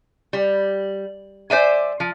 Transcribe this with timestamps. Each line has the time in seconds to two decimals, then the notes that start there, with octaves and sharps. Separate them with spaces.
0.33 G3
1.50 C5 D5 E5 G#5
2.00 F3